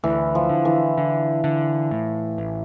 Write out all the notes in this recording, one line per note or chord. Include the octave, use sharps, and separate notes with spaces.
D2 E3
F3
D3
E3
D3
D3
A2
A1